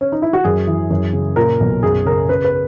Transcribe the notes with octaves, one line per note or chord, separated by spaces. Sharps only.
C#4
D#4
E4
F#4
F#2 G#4
E3
F#2
C#3
A#2 A#4
B1
F#2 G#4
C#3 A#4
C#3 B4
B4